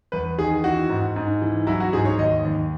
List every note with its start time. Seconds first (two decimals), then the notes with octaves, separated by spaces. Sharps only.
0.12 E2 B4
0.38 D#3 G#4
0.64 E3 F#4
0.89 G#2
1.16 G#2
1.42 E3
1.67 F#3 E4
1.80 F#4
1.93 G#2 G#4
2.05 C#5
2.19 D#2 D#5
2.45 D#2